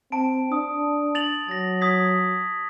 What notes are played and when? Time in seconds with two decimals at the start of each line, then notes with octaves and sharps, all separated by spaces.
0.12 C4 A5 D7
0.52 D4 D#6
1.15 A6 F7 F#7
1.48 F#3 A6 A#6
1.81 D#6 G#6 B6